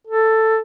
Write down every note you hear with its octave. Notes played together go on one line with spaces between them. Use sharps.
A4